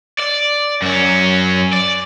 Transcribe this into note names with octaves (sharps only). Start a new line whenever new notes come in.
D5
F#2 C#4
D5